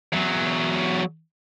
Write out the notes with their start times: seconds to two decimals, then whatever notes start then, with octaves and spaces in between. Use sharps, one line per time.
0.13 E2 F#3